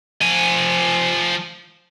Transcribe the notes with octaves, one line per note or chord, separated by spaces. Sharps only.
F3 G#5